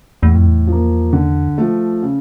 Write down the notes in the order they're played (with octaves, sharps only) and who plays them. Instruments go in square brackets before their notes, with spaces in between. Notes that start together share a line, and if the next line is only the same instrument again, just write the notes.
[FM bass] E2 [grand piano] A2
[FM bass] F2
E2
[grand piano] F3 A#3
D3
F3 A3
C#3